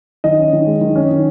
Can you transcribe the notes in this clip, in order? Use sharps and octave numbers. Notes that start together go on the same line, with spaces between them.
D#3 D#5
C#4
D#3
G#3
D#3
C#4
D#3